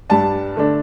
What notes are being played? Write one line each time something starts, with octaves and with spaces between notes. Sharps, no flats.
G2 G3 D4 A5
D3 A3 D4